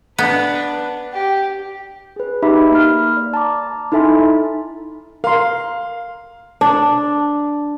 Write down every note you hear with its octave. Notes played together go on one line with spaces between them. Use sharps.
B3 D4 B4
G4
G#4 B4
D#4 G4 E5 B5
A#3 B5 F6
D5
A5 A#5 D6
D#4 E4 A4 E5 G#5 C6
A#4 F5 C6
D4